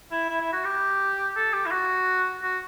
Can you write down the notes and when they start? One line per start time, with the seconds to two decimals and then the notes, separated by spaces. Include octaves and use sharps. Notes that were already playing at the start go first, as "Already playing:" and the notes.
0.11 E4
0.30 E4
0.40 E4
0.52 F#4
0.65 G4
1.36 A4
1.53 G4
1.66 E4
1.71 F#4
2.43 F#4